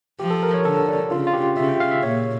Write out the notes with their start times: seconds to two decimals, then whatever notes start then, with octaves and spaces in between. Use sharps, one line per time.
0.20 F3 G4
0.30 A4
0.43 A#4
0.54 C#5
0.65 D3 A4
0.88 D4
1.11 C#3 F4
1.27 F4
1.34 G4
1.57 C#3 E5
1.69 G5
1.80 F5
1.91 E5
2.03 A#2 C#5